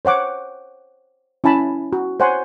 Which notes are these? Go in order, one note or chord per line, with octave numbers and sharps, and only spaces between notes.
C5 C#5 F#5 D6
C#4 E4 G#5 A5 B5
F#4
C5 C#5 F#5 G#5 C6